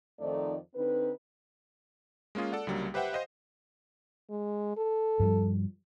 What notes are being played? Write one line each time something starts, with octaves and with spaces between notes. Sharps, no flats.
F2 D#3 F3 A3 D#4 D5
D3 C4 D#4 B4
G#3 A#3 C#4 F4 G#4
A4 D5 F#5
C#2 D3 F#3 G3 A#3
G4 B4 C5 E5 F#5 G5
C5 D#5 F5
G#3
A4
G2 F3 G3